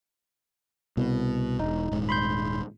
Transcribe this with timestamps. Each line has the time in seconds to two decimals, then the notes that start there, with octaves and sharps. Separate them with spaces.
0.97 C2 B2
1.60 E1 D#4
1.92 D#1 G#2
2.09 B5 C6 G6